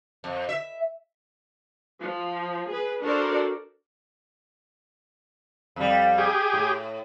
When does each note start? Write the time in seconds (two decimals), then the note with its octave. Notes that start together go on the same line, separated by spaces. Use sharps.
0.24 F2
0.49 E5
2.00 F3
2.69 G#4 B4
3.01 D4 F#4 A4 A#4 C5 D5
5.76 F2 G3
6.18 G4 G#4
6.53 A2